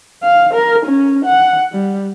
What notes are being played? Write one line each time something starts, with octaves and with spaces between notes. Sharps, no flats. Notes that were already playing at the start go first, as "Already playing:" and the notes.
F5
A#4
C#4
F#5
G3